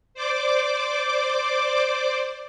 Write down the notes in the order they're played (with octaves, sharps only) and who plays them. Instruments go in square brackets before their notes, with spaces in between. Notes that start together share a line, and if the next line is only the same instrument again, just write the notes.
[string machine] C5 D5 D6